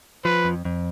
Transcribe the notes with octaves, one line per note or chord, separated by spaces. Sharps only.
F3 B4
F2
F2